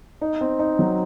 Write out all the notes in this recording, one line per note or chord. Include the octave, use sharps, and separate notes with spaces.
D#4
C4
D#4
F#3